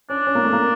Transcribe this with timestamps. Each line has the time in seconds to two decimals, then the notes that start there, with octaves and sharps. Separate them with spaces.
0.09 C#4 D4
0.27 C#4
0.35 A#3
0.44 A3
0.52 A#3